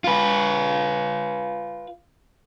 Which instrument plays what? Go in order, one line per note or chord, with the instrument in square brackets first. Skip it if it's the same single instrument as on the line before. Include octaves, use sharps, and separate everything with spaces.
[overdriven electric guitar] F4 B4